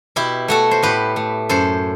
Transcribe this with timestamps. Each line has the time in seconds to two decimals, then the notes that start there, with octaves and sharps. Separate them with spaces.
0.16 B2 E4 G4
0.48 A3 F#4 A4
0.71 C5
0.83 A2 G4 B4
1.16 A3
1.49 F#2 A4 C5